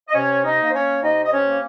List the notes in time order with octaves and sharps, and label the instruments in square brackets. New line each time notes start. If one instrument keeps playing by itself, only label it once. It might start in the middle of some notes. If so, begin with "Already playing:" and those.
[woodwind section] D#5
C3 C#4 C#5
D#4 D#5
A#3
C5
C#4 C#5
C3 D#4 D#5
D#5
C#4 C#5
A#3